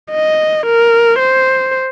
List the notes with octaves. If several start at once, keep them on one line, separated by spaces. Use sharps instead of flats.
D#5
A#4
C5